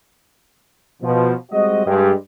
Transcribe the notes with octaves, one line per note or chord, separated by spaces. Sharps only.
B2 F3
G3 G#3 C4 F#4 D#5
G2 G#3 G4